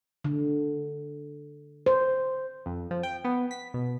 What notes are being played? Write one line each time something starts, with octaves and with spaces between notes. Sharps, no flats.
D3
C5
F2
F3
G5
B3
B6
B2